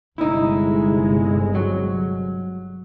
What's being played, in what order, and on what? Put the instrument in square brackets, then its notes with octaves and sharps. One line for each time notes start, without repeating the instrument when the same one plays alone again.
[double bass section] G1 C3 G#3 [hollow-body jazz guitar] D#4 E4
[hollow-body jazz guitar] F#3